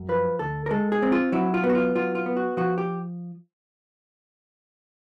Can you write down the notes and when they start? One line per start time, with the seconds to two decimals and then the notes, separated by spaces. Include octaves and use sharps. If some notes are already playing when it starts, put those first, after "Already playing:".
Already playing: F#2
0.09 F3 B4
0.39 D2 A4
0.66 A#4
0.71 G#3 A4
0.92 G#4
1.02 C4
1.12 F4
1.32 F#3 E4
1.54 F4
1.64 B3
1.69 F#4
1.75 F4
1.95 F#3 F4
2.15 F4
2.26 B3
2.37 F#4
2.57 F3 F#4
2.78 G4